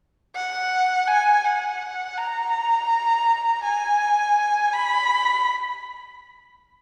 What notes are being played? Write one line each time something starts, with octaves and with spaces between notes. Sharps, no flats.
F#5
G#5
F#5
A#5
G#5
B5